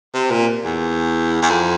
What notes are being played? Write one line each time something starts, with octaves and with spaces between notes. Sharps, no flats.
C3
A#2
E2
E2
F2